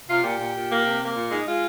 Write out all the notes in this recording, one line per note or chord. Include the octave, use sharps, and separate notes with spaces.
C3 F4
A#2 G4
A#2
A#2
A#3
C3
A#3
A#2
G#3 D#4
G#3 F4